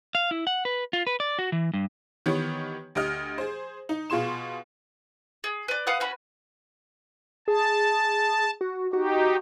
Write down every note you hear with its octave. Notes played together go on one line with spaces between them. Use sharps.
F5
E4
F#5
B4
F4
B4
D5
F#4
E3
G2
D#3 E3 B3 G4 C#5
D2 G4 D#5 F6
G#4 C5
D#4
B2 F4 G#4 C6 E7
G#4
B4 D5
B4 F5 F#5 D#6
C#4 F#4 B4
G#4 A5
F#4
D#4 F#4 G4